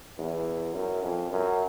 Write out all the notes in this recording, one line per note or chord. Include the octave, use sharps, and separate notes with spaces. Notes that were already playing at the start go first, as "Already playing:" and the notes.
E2
F#2
F2
F#2